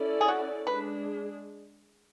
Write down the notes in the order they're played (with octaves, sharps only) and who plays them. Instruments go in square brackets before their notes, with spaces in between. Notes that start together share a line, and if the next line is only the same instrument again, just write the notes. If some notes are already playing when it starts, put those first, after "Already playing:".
Already playing: [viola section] C#4 E4 A4 D5
[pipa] G#4
F#4
[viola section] G#3 D4 G#4 [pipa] B4